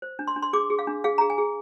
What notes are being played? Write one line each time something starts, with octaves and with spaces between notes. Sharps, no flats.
C5
D4
C6
D4
C6
G#4 D6
G#4
F5
D4
G#4 F5
G#4 A#5
G#5
G#4